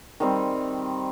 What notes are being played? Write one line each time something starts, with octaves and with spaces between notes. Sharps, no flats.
D#3 G3 C4